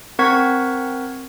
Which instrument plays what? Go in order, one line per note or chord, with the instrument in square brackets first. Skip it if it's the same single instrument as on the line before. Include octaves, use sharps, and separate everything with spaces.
[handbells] C4 A#4 F#5 C#6 G#6 B6